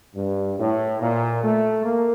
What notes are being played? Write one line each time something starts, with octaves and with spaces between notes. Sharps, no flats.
G2
A2
A#2
A3
A#3